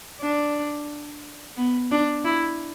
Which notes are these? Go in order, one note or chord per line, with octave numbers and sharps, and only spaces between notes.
D4
B3
D4
E4